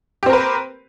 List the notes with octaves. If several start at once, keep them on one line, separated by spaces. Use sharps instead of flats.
C4 G4 A#4 B4